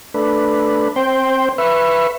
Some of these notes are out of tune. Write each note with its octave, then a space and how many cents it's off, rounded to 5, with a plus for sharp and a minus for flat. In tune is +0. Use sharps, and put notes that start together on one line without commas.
A3 +0 D4 +0 B4 +0
C4 +20 C5 +0 G5 +0
B4 +0 E5 +25 C#6 -20